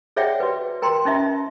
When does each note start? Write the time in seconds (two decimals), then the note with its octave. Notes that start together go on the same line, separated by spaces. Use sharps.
0.16 G#4 C#5 D5 E5 F#5 G5
0.40 F#4 B4
0.82 A#4 G5 A#5 C6
1.05 C#4 D#4 F4 E5